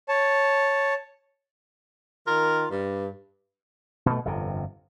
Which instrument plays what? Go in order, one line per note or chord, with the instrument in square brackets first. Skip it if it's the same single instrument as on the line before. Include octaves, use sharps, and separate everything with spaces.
[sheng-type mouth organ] C#5 A5
[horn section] D#3 F4 A#4
G2
[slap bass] B2 A3
G1 F2 C3